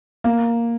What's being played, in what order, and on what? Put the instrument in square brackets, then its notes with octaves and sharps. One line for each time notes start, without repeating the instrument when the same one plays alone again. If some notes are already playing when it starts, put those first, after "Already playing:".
[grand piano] A#3